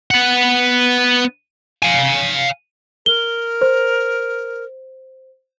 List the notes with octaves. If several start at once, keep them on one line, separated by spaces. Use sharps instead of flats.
B3 F#5
F5 G#5
A#4 G7
C5